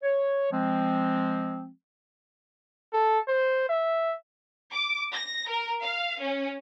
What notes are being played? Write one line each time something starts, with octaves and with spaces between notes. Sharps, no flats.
C#5
F3 G#3 C4
A4
C5
E5
D6
A#6
A#4
F5
C#4